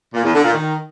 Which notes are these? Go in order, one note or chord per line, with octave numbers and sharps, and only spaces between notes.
A#2
E2
D3
A#2
D#3